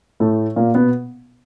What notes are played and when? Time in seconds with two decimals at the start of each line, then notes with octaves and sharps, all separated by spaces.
0.20 A2 A3
0.56 A#2 A#3
0.75 B2 B3